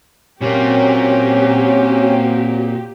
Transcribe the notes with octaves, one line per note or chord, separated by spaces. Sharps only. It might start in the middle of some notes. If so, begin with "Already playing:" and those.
A#2 F#3 A#3 C4 C#4 G4